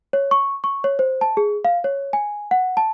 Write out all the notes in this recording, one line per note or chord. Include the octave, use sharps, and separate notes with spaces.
C#5
C#6
C#6
C#5
C5
A5
G#4
F5
C#5
G#5
F#5
A5